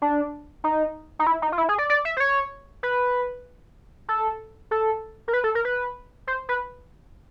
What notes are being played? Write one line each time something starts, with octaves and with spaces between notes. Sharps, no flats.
D4
D#4
D#4
E4
D#4
F4
E4
G#4
D5
D5
E5
C5
C#5
B4
A4
A4
A#4
B4
A4
A#4
B4
C5
B4